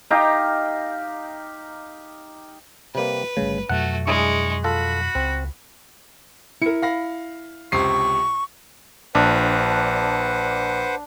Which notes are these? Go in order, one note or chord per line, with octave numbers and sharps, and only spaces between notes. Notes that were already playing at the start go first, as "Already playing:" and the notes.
D#4 G4 F5 A#5
C3 G3 A#3 B4
G1 C#3 G3 A3
F2 B2 F#3 A3 F#4 F#5
G#3 D4 E4 G#4 C#6
F4 F#4 A4 B5
C#2 C4
E4 A#4 C#7
F5 B5 A#6
C#2 C3 C#6 C7
A#1 D4 B4 C5 F#5